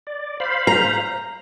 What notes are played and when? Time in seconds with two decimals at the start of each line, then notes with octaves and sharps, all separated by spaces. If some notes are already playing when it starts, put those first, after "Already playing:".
0.07 D5
0.40 C5 F5 B5
0.67 A#5